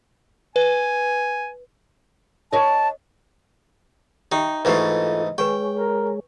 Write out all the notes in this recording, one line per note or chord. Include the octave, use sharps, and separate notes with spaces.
B4 G#5
C#5 D#5 A5
D#4 G4 E5 G5
G#2 E3 A3 F4 G4 A4 B4 D#5
G#3 G#4 B4 C#5 G5 G#5 C#6
A#4